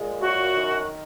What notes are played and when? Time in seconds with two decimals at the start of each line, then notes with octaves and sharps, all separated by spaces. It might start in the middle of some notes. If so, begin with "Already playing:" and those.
Already playing: A#2 G#3
0.20 F#2 F#4
0.55 D#3